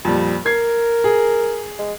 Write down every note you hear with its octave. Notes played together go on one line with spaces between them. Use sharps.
F2 A#2 G3
A#4 G#6 C7
G#4
G#3